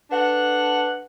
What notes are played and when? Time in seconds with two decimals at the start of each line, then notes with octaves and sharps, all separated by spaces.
0.11 D4 A4 B4 F#5